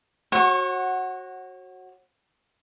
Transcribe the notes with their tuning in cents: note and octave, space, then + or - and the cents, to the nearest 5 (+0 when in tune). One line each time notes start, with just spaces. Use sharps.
F#4 +0 C#5 -40 F#5 +0